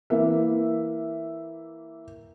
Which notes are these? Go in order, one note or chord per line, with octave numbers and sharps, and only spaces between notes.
E3 A#3 E5